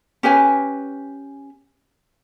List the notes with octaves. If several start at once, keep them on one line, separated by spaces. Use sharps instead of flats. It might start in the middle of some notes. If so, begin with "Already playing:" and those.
C#4 G4 B4 G#5